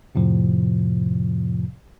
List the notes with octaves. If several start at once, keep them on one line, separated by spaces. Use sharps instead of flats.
F2 A2 C3 F3